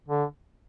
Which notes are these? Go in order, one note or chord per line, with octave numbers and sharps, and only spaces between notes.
D3